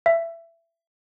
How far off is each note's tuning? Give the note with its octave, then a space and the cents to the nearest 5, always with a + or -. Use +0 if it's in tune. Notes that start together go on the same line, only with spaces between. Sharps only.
E5 +20